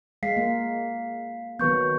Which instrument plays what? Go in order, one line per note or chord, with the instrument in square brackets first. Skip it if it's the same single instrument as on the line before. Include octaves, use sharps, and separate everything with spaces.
[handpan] G#3 [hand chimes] F5 B6 C7
[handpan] A#3
[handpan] D#3 F#3 B3 [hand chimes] B4 C#6 G6